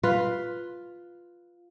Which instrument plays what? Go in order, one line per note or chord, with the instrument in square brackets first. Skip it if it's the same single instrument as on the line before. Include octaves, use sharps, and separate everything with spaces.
[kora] F4 B4